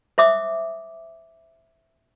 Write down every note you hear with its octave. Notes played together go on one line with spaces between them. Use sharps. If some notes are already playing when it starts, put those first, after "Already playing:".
C5 E5 D6 D#6